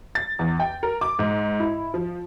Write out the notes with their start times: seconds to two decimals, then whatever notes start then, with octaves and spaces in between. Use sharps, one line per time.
0.15 A6
0.39 E2
0.60 G5
0.83 A#4
1.01 D6
1.19 G#2
1.60 E4
1.94 F3